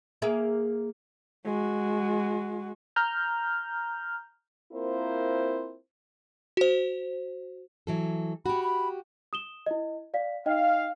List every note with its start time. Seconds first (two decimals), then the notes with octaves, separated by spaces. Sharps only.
0.22 A#3 G#4 E5
1.45 G#3 F#4
2.96 A#5 F6 G6
4.72 A#3 C4 E4 F4 A#4 C5
6.57 F#4 C5
7.87 E3 F#3 A4
8.46 F#4 G4 B5
8.63 B5
9.33 D#6 E7 G7
9.66 E4 D#5
10.14 D5 F5 B6
10.46 D#4 D#5 F5 G5